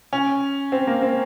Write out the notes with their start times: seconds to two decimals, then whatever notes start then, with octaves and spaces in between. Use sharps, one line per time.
0.13 C#4
0.72 C4
0.87 A#3
1.02 C4